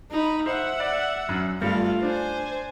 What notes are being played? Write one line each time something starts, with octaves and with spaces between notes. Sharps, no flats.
D#4 B5
C5 E5 F#5
D5
F#2
G2 A3 F4
D4 C5 G#5